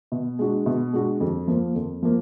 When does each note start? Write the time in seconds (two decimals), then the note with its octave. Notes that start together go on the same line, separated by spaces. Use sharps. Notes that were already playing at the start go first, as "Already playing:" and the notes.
0.12 B2
0.39 G#3 D4 F#4
0.66 B2
0.93 G#3 D4 F#4
1.20 F2
1.48 F3 A#3
1.75 F2
2.03 F3 A#3